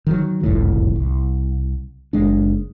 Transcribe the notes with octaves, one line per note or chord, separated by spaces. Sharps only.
D#3 E3 F#3
F#1 C2 F2 A2
C2
F#1 G#3 D4